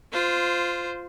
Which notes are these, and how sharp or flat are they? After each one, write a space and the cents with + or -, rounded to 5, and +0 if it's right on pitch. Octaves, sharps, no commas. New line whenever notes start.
F4 +0 C5 -15